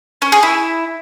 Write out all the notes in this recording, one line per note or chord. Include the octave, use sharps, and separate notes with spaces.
C#4
G#4
E4